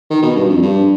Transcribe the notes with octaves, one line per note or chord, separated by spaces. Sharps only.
D#3
B2
G2
F2
G2